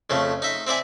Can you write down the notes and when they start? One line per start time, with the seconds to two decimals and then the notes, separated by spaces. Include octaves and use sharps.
0.10 F2 C#3 A3
0.42 D#4 E5
0.67 C4 E4 D5 E5 G#5